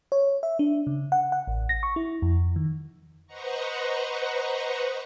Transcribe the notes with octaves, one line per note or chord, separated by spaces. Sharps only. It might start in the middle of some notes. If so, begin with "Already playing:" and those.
C#5
E5
D4
C#3
F#5
F#5
A1
A#6
C#6
E4
F2
D#3
B4 C5 D#5 F#5 A#5 C#6